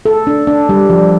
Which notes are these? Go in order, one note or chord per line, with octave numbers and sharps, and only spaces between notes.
A4
D4
D4
G3
F3